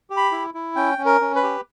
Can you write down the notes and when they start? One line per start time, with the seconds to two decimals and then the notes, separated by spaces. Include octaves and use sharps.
0.10 G4
0.17 B5
0.32 E4
0.54 E4
0.76 C#4 G5
0.98 C#4
1.06 A#4
1.21 C#4
1.35 B4
1.43 G4